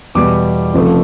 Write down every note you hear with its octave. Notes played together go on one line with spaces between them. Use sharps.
E2 B2 G3 D6
F1 F2 C#3 F3 A3